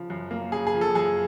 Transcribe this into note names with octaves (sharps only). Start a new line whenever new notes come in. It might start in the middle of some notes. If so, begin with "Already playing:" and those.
Already playing: C#3 F3
F#2
A#3
C#3 G#4
G#4
F3
A4
F#2 G#4